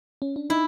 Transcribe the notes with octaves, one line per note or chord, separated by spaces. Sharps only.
C#4
D4
D#4 E4